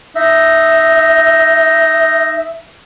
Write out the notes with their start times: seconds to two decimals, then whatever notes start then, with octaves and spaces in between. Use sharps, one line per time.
0.16 D#4 E5